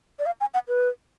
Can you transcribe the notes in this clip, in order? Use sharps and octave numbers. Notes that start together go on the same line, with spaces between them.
D5
F5
G#5
F#5
B4